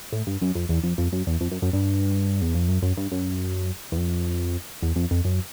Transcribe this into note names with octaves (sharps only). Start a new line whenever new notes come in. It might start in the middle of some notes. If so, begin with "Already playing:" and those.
A2
G2
F#2
F2
E2
F2
F2
F#2
E2
F2
F#2
F#2
G2
E2
F2
F#2
F#2
G2
F#2
E2
F2
E2
F2
F2
F#2